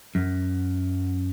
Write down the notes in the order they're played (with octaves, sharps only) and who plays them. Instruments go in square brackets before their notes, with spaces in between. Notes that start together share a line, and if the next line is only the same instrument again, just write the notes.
[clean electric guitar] F#2